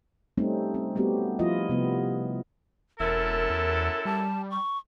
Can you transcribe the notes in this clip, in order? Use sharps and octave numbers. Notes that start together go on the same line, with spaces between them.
G3 A3 C4 C#4 D#4
C4
G3 A3 B3 C4 F#4 G4
F3 E4 F4 D#5
C3 G3 B3
E1 F#2 E4 A4 A#4
E2
G3 A5
C#6